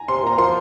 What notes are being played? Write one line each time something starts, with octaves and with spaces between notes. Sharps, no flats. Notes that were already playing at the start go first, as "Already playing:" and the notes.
Already playing: G#5 A#5
C3 C6
A#2 A#5
F3 C6